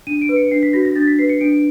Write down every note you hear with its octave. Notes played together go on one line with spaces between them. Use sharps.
D4 D#7
D7
B4
C#7
D4 C7
B6
F#4 A#6
A#6
D4 A6
B6
B4 C7
C#7
D4 D7